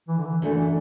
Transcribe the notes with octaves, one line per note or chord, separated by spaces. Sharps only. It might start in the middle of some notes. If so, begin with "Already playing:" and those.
E3
D3
E3
F#2 D3 E3 A3